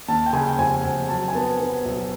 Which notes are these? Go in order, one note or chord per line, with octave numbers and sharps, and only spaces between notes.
D#2 A5
G5
C#3 G#5
G5
F1 G#5
F1
F#3 A5
G#5
B3 A5
B3
B1